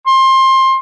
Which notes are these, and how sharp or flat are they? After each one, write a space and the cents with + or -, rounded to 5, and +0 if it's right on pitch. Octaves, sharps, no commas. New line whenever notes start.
C6 +20